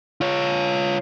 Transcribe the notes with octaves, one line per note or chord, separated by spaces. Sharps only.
F4 C#5